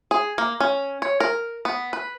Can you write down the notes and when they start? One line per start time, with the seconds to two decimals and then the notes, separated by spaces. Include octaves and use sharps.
0.11 G#4
0.38 A#3
0.60 C#4
1.02 C#5
1.20 A#4
1.65 B3
1.93 B4